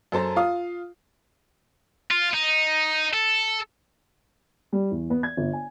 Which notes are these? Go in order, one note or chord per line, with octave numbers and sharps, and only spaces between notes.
F#2 A4 C5 A5 A#5
F4 F5 D#6
F4
D#4
A4
G3
E2
B3
G#6
G1
G#5